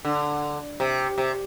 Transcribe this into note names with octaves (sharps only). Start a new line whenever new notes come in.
D3
C3
C3